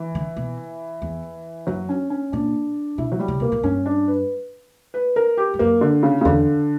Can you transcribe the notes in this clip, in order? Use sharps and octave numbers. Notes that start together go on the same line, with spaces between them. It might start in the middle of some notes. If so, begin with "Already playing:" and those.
Already playing: E3
D3
B2
E2
F#2 F#3
C#4
C#4
A#2 D4
B2 E4
F#3
G3
C#3
B2 A#3
A#2
G2 C#4
D4
B4
B4
A#4
G4
G2
F#2 A#3
D3
C#3
C#3
E2 D3